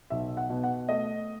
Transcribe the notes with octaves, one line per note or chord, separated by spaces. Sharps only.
B1 E5
F#5
B2
F#5
A3 D#5